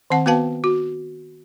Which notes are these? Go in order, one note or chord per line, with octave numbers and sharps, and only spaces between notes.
D#3 C4 F#5 A5
B3 F#4 B4 F5 G5 A5
F#4